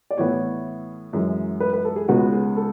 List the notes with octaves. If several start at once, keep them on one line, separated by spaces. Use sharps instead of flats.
D5
A2 E3 B3 C#5
F#2 E3 G#3
B4
B4
A4
G#4
C#2 C#3 G#3 B3 F#4
G#4
A4